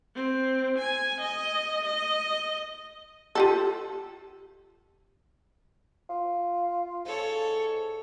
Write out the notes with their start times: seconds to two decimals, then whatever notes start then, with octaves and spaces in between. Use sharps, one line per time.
0.16 C4
0.79 G#5
1.21 D#5
1.85 D#5
3.35 F4 G4 A4
6.09 F4
7.05 G#2 A4 C#5